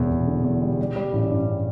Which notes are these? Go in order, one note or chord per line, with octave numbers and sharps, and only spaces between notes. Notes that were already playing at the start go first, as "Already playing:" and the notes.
Already playing: E1 E2
E1
D3
E2
G3
G3
G3
A1
G2